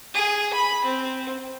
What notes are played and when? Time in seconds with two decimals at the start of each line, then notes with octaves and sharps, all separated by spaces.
0.14 G#4
0.53 B5
0.84 C4